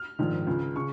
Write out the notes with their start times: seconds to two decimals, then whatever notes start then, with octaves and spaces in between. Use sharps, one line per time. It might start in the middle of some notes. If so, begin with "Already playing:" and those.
Already playing: F6
0.19 A#1 G#2 D#3
0.47 C#2 C#3
0.76 C#3 C#6